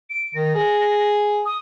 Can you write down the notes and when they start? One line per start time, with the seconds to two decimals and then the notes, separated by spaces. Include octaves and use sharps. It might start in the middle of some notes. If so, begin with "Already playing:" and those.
0.10 D7
0.34 D#3 A#6
0.55 G#4
1.45 D#6